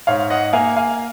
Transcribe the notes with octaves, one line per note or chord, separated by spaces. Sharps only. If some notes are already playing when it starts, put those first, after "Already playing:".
G#2 C#5 F5
D#5 F#5
A#3 F5 G#5
F5 G#5